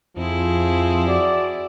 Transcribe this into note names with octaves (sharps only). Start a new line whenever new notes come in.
F2 F3 C4 E4 G#4
F#4 D5